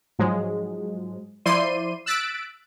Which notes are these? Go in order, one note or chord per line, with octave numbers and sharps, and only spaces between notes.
G#2 F3 F#3 G#3
F3 E4 C5 D5 C6 D#7
E6 F#6 A6 B6 D7